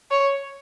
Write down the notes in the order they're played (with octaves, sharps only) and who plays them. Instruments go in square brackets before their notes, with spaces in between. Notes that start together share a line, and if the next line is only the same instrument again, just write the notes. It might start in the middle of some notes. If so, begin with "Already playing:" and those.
[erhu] C#5